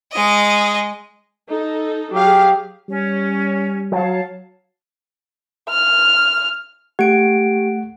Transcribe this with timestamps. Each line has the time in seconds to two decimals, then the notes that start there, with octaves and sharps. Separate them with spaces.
0.13 G#3 D#5
1.49 D#4 A4
2.12 F#3 G4 G#4 F5
2.89 G3 C#4
3.92 F#3 C#5 F5 A5
5.69 F6
6.99 A3 G4 F#5 D7